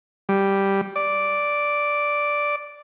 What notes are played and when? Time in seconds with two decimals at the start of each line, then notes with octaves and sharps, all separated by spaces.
0.29 G3
0.96 D5